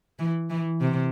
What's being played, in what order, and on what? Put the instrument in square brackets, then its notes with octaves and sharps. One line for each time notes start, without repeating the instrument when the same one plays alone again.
[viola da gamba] E3
E3
C3